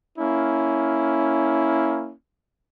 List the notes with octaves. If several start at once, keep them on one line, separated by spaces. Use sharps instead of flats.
A#3 C#4 E4